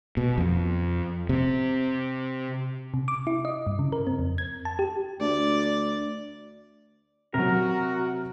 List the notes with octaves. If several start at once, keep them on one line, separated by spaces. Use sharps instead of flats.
B2
F2
C3
C3
D6
E4
D#5
G2
C#3
A#4
C4
F2
G#6
A5
G4
D2 D5
C3 F#3 F#4 A#4